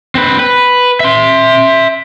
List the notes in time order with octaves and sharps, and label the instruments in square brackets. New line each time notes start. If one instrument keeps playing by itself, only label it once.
[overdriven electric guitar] C4 B4
B4
E5 C6